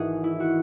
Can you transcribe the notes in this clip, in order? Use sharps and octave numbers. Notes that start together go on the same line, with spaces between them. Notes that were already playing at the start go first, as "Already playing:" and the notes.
Already playing: G#1 G#2 E3 F#4 G#4
E4
F#4